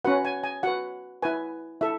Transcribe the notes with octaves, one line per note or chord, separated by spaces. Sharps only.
C#4 F#4 B4 F#5
G#5
G#5
F#4 B4 F#5
E4 B4 G#5
E4 A4 E5